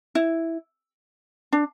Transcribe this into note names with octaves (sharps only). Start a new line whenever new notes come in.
E4
D4